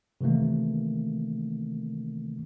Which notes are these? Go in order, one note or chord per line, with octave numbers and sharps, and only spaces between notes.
C3 D#3 E3 A3 A#3